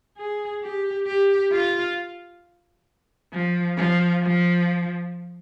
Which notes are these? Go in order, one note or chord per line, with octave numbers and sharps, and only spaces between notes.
G#4
G4
G4
F4
F3
F3
F3